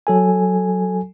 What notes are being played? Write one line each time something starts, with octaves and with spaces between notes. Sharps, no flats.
F#3 A4 G#5